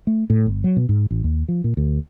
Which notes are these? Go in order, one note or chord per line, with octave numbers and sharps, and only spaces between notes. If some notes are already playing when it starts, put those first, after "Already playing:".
A3
A2
G1
F#3
B2
G#2
A1
D#2
F3
A#2
D2